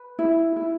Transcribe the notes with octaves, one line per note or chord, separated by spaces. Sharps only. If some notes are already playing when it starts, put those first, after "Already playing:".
Already playing: B4
E4
E4